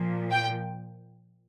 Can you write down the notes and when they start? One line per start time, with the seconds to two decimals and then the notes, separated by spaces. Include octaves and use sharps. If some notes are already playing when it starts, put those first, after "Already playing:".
Already playing: A#2 F3
0.31 G5